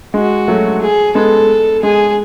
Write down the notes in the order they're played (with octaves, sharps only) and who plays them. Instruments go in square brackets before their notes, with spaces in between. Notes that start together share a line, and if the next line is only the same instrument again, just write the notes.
[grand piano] G#3 [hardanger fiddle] F#4
[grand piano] F#3 A3
[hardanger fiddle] G#4
[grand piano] G#3 B3 [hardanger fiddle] A4
[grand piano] G#3 [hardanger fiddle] G#4